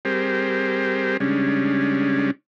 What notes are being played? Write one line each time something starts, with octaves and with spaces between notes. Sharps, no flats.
G3 C4 G4 G#4 A#4 C5
C#3 G3 G#3 C#4 D4